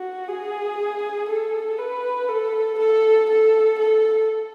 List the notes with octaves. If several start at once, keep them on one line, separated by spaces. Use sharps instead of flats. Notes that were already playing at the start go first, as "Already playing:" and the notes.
Already playing: F#4
G#4
A4
B4
A4
A4
A4
A4